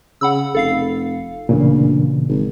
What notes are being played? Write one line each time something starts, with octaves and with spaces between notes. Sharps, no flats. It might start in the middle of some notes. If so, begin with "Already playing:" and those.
C#3 F#5 B5 E6
F1 A4 F5 C7
D2 A#2 C#3 E3
G#1